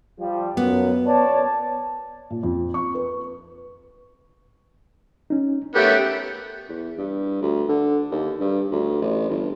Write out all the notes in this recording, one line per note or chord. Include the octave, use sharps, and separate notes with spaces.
F3 G3
F#2 B3
C#5 D5 A5
A#2
F2
C#6
B4
C#4 D#4
A3 B3 G4 A#4 C#5 E5
E2
G2
D2
D3
D#2
G2
D2
A1
G1